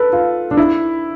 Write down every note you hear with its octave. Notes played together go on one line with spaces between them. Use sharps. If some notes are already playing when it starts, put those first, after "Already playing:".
Already playing: A4 B4
F4
D4
E4